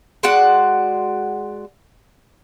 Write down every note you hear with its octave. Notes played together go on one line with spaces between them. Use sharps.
G#3 F#4 D5 F#5